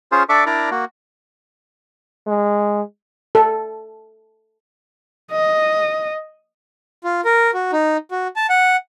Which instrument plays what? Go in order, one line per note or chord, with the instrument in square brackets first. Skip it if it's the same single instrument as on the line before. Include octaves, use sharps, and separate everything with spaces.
[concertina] C#4 F4 G#4 C5
D4 A4 D5 E5 C#6 D6
D4 E4 A#4 D5 A#5
A#3 F#4
[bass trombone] G#3
[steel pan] A4
[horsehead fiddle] D#5
[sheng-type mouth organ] F4
A#4
F#4
D#4
F#4
A5
F#5